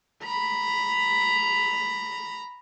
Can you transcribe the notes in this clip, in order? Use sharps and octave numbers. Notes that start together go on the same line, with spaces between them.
A#5 B5